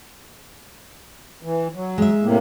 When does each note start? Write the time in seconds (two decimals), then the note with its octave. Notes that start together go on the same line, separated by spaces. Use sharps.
1.43 E3
1.74 F#3
1.98 G#3 E5
2.22 A2 C3 A#3